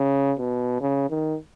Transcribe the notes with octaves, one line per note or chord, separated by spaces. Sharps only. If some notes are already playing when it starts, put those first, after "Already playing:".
Already playing: C#3
B2
C#3
D#3